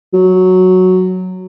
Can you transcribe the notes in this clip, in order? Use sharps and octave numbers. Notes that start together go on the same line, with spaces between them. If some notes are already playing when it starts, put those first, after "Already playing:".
F#3